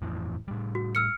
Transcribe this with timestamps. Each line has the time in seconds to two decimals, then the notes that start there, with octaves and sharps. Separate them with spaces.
0.02 F2 A2 E3
0.48 A2 G3
0.75 F#4
0.95 E6 F6 C#7